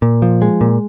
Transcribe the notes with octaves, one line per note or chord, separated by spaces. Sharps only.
A#2
F3
G#3
A#2